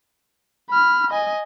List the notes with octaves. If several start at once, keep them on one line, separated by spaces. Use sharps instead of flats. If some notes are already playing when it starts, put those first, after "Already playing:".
B5 F6
D#5 G#5